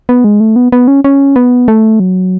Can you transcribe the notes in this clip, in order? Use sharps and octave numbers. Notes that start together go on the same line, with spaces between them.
B3
G#3
A3
B3
B3
C#4
C#4
B3
A3
F#3